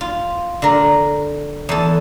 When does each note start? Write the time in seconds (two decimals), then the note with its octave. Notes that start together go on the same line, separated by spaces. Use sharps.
0.01 F4
0.62 D3 A#4
1.69 E2 A4